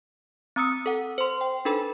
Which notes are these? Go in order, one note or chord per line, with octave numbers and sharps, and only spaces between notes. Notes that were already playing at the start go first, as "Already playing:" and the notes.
C4 A#5 D#6 E6 C#7
A4 F#5
C5 C6
G5
D4 D#4 A4 B4 B5